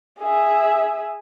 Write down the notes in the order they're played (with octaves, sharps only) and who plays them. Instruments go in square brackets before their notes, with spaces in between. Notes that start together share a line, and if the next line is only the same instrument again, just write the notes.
[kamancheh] G#4 E5